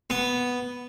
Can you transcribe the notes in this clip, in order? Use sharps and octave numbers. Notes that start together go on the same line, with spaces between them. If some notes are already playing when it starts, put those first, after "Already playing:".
B3